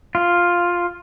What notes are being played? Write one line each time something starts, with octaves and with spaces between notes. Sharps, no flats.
F4